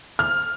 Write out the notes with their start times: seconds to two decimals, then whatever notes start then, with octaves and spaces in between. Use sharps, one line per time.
0.19 F6